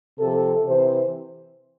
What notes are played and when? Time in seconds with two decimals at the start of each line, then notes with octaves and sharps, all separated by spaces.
0.19 C3 F3 A4
0.66 C3 E3 C5